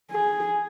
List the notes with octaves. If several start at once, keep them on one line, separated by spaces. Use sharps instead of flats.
G#4